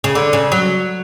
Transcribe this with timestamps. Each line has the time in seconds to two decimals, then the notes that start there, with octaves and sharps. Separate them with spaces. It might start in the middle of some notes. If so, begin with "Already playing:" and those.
0.04 C#3
0.15 D3
0.33 C#3
0.52 F#3